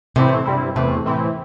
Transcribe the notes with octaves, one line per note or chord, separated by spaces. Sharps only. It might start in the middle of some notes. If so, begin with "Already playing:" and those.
A2 C3 E3 A3 C4 E4
G2 G3 C4 E4
E2 C3 E3 A3
A2 E3 C4 E4